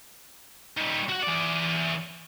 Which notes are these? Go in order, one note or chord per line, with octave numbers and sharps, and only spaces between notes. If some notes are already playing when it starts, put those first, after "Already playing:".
D#3 G3
F#4 F#5
E3 D5